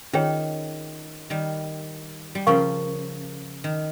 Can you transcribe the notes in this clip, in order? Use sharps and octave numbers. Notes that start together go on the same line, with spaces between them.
D#3 C#4 F4 G#4 C#5 G5
D#3 G3
G3
C#3 F3 A#4 F5 A#5 C#6
D#3